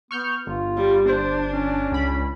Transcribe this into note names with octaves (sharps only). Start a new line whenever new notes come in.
B3 C#6 F6 G6
G1 F4
G3
D4 C5
C#4
C#2 B5